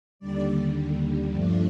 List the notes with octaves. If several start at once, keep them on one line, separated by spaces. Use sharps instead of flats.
D#2 D3 G3 D5
G2 F3 A3 D4